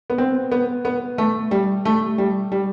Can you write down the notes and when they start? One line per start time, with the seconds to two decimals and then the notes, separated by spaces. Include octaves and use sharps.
0.10 B3
0.18 C4
0.52 B3
0.85 B3
1.18 A3
1.51 G3
1.85 A3
2.18 G3
2.52 G3